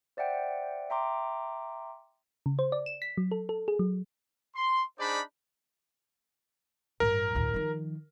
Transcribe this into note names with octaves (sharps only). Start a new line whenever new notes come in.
C5 D5 E5 F#5 G5
E5 G5 A#5 C6 D6
C#3
C5
D5
E7
B6
F#3
A4
A4
G#4
F#3
C6
D4 D#4 G#4 C5 D5 B5
A1 G2 A#4
D2 A2
D#3 F3